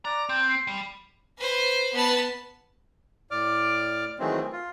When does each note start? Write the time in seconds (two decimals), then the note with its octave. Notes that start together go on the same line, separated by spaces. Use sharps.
0.05 D5 A#5
0.29 C4 G5
0.48 C6
0.67 G3
1.38 B4 C5
1.93 B3 A5
3.31 A2 D5 D6 F6
4.19 D#3 E3 F#3 G#3 A3 C4
4.53 F4